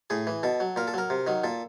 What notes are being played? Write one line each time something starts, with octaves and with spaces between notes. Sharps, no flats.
A2 G#4
E3
B2 A4
F#3
A#2 A#4
A4
F#3 A#4
C3
D#3 F#3
A#2 A4